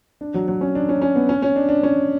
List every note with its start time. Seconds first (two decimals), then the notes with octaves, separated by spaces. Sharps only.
0.21 D4
0.34 F#3
0.48 F#3
0.61 C#4
0.75 D4
0.89 C#4
1.02 C#4
1.16 B3
1.29 C#4
1.42 C#4
1.56 D4
1.69 D4
1.83 C#4